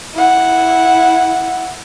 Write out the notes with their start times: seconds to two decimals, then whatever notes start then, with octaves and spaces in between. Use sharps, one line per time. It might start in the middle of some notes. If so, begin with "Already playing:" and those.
0.14 E4 F#5